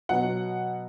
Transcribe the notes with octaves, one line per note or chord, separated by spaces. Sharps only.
B2 F#3 B3 F#5